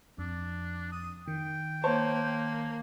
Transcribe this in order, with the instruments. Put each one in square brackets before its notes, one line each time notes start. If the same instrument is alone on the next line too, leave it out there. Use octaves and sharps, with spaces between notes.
[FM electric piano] F2 [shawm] D4
[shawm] D#6
[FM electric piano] D#3 [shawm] G5
[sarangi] A#3 [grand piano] C5 C#5 A5